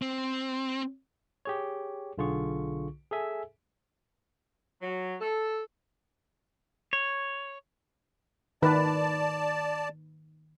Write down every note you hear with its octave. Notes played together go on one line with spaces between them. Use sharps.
C4
G4 G#4 C#5
B1 D3 F4 G#4 C#6
G#4 A4 E5 G#5
F#3
A4
C#5
D#3 B4 D5 A5